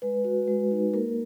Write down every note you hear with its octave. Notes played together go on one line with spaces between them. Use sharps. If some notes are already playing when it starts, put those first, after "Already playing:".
G#3 B4
F#4
G#3
D#4
A#3 A#4